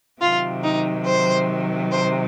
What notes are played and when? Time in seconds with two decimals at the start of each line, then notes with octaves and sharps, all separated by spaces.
0.21 C3 D#3 F#3 F4
0.63 D#4
1.06 C5
1.91 C5